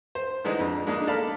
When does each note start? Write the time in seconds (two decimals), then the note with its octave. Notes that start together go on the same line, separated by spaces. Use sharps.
0.15 C5
0.45 D3 E3 G#3 D#4 D5
0.60 F2
0.87 G#3 A#3 D4 D#4
1.07 A4 D5 F5 B5